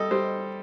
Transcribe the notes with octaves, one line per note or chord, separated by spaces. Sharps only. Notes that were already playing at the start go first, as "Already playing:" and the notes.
Already playing: G3 A4 D#5
G3 C5